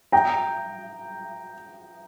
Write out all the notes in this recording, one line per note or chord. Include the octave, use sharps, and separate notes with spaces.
G5 A#5